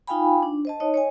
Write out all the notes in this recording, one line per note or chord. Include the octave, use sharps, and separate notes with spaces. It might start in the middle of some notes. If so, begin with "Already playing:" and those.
D#4 F4 F5 G5 G#5 B5
D4
C5 D#5 A5
D#4 C#5 D#5
C#5 D#5 G#5